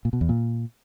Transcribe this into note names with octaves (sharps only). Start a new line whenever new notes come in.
A#2
B2
E2
A#2